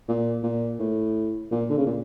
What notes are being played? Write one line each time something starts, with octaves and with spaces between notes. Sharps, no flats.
A#2
A#2
A2
A#2
D3
C#3
A#2